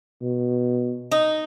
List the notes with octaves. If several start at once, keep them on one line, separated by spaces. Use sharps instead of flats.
B2
D#4